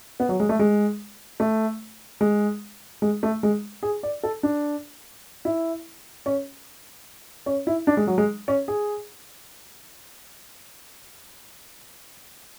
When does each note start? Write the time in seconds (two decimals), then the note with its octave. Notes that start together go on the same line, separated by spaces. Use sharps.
0.20 B3
0.29 F#3
0.40 G#3
0.49 A3
0.59 G#3
1.40 A3
2.21 G#3
3.02 G#3
3.23 A3
3.43 G#3
3.83 G#4
4.03 D5
4.23 A4
4.43 D4
5.45 E4
6.26 C#4
7.46 C#4
7.67 E4
7.87 D4
7.97 G#3
8.07 F#3
8.18 G#3
8.48 C#4
8.68 G#4